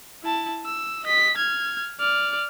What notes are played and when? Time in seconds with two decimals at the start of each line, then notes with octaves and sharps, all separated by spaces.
0.23 E4 A5
0.65 E6
1.04 D#5 B6
1.37 F6 G#6
2.00 D5 F6